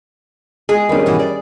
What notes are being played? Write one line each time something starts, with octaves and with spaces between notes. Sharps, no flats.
G#3 G#4
D#3 G3 C#4 D4 B4
B2 E3 F#4
D5